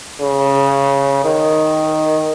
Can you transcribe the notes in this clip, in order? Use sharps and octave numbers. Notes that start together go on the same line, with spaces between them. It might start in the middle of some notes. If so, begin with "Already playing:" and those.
C#3
D#3